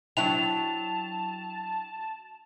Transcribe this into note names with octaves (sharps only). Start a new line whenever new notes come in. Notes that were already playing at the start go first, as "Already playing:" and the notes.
F#3 D4 E4 G5 A5 F7